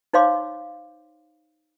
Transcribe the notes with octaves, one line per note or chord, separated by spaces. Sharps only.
D#4 C5 C#5 F5 C6 D6